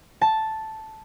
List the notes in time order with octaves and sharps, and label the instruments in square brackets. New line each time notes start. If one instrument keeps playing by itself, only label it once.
[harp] A5